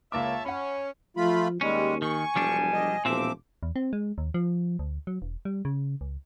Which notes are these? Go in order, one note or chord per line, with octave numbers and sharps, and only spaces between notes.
C#2 A#3 C#5 E5 A5 D6
C#4 F#5 B5
F3 A3 F4 B5
D#2 G3 G#3 C#4
D#3 G#5 C#6
E1 F3 G3 D4
D#5
E1 A#2 F3 C4 E5 D6
E2
C4
G#3
D#2
F3
D2
F#3
E1
G3
C#3
C#2